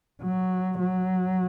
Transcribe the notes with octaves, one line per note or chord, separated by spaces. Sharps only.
F#3
F#3